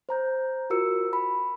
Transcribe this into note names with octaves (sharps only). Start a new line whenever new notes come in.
C5 A#5 G6
F4 F#4 A#4 E6 C#7
B5